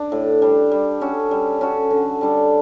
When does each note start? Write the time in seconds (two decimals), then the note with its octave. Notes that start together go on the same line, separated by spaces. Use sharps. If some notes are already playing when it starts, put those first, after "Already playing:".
Already playing: D4
0.12 A2
0.42 G3 D4
0.72 G3
1.01 C#4 F#4 A4
1.31 G3
1.61 C#4 F#4 A4
1.90 D3
2.21 G3 D4 A4